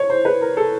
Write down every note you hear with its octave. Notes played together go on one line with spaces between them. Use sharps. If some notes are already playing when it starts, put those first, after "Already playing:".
Already playing: C#5
C5
B4
A#4
A4